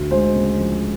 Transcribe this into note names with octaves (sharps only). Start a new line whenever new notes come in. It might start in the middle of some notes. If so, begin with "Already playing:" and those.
Already playing: D2
G#3 C5
C#3
F3